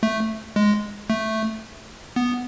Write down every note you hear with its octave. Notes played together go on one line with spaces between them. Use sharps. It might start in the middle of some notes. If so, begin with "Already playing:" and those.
A3
G#3
A3
B3